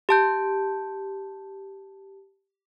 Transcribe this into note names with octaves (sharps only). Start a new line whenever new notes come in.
G4 A5 G6